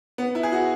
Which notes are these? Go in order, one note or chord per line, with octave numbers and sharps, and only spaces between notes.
B3
E4
G#4
F#4